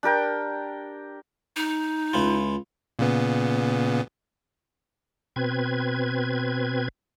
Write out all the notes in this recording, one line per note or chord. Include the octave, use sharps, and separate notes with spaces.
D4 G4 A#4 G5
D#4
C#2 E4 F4
A#2 C#3 B3
B2 C4 B4 G#6